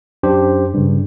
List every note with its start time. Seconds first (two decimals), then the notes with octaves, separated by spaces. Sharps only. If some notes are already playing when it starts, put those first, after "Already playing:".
0.23 F#2 D4 G4 C5
0.74 G2 C#3